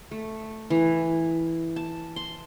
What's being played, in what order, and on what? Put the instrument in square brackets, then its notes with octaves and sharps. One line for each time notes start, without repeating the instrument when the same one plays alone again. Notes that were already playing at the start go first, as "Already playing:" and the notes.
[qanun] A3
E3
A5
C6